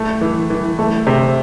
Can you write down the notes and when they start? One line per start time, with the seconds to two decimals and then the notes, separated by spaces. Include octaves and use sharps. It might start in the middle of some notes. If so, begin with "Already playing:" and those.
Already playing: A2 A3
0.21 E3
0.50 E3
0.79 A3
1.07 C3